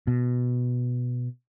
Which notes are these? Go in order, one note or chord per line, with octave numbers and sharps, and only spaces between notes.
B2